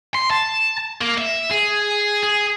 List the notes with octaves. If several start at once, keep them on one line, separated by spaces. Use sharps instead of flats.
C6
A5
A#3
E5
G#4
G#4